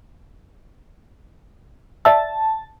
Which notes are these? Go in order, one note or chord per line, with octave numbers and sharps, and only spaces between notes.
D5 E5 A5 E6